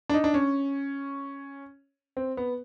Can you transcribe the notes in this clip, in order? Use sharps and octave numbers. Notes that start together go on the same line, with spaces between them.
D4
D#4
D4
C#4
C4
B3